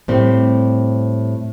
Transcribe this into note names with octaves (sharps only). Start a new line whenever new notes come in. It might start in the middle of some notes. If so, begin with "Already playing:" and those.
A2 G3 C4